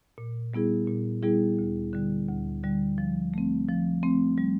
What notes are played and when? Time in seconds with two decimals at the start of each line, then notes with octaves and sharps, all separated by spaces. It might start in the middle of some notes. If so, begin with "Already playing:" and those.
0.18 A#2
0.54 G3 B3 E4 G#4
0.88 A#2
1.23 G3 B3 E4 G#4
1.59 D2
1.93 D3 G3
2.28 D2
2.63 D3 G3
2.98 F3
3.34 A3 C4
3.68 F3
4.03 A3 C4
4.38 G3